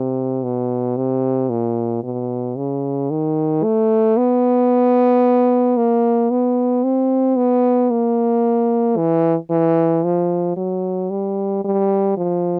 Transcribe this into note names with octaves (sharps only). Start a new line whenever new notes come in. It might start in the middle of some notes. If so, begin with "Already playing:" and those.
Already playing: C3
B2
C3
A#2
B2
C#3
D#3
A3
B3
A#3
B3
C4
B3
A#3
E3
E3
F3
F#3
G3
G3
F3